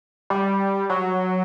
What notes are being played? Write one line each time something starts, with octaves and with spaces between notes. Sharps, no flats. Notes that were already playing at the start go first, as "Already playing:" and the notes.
G3
F#3